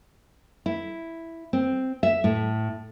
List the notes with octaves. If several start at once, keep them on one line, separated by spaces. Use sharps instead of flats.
E4
C4
E5
A2